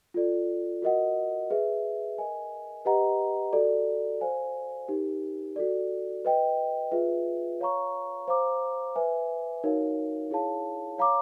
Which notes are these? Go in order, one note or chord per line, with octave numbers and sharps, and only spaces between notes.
F4 A4 D5
F#4 A#4 D#5 F#5
G#4 B4 E5
A#4 D#5 G#5
G4 B4 D#5 F#5 A#5
F#4 A4 D5
C5 F5 G#5
D#4 G4 A#4
F#4 A4 D5
B4 D#5 G5
F4 G#4 B4 E5
C#5 F5 A#5 C#6
C5 F5 A#5 D6
B4 E5 G#5
D#4 F#4 A#4 C#5 F5
E4 G#4 C#5 F5 A5
C#5 F5 A#5 D6